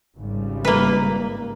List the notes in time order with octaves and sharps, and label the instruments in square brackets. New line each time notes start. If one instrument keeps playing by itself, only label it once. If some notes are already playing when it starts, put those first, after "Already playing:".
[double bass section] G#1 C#3 G3
[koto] A#3 B4